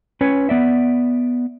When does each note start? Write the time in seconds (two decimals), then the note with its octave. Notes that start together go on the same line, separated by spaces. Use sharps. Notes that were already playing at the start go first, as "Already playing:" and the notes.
0.21 C#4 B4 C#5
0.49 B3 D5 E5